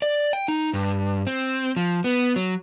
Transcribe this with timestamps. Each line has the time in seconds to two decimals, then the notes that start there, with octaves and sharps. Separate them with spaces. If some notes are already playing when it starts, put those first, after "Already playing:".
0.02 D5
0.33 G5
0.48 D#4
0.74 G2
1.27 C4
1.76 F3
2.04 B3
2.36 F#3